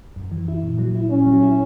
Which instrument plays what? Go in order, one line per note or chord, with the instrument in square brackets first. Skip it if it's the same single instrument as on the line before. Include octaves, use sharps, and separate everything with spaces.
[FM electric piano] F#2
E3
E4
A#2
F#3
E4
[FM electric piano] A#2 [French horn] C#4
[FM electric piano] F#3
E4